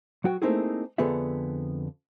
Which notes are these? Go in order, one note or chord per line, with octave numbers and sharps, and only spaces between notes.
F#3 F#4 G5
A3 A#3 C4 D#4 E4 G#4
F2 D3 B3 G#4 A4 E5